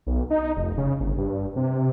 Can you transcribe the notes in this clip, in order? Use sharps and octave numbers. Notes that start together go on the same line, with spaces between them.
B1
D#4
F1
C#3
G1
G2
C3